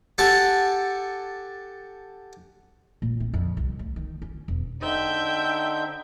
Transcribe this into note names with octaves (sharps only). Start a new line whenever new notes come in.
G4 A4 F#5 G#5 A5
A#2
C4
F2
C2
D2
D#3
C#4
E1
D3 D#4 C5 E5 G5 G6